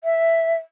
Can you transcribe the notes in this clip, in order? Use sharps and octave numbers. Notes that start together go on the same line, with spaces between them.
E5